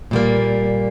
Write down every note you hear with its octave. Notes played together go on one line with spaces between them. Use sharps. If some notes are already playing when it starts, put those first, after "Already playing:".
A#2 G3 A#3